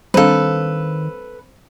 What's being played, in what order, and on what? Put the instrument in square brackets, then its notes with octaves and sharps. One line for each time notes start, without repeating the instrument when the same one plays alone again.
[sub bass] D#3 [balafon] G3 C4 D4 [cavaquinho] A4 B4 [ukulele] C5 F5